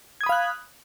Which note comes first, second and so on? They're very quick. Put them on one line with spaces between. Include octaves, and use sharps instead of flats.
G#6 D#6 B5 F5 F#6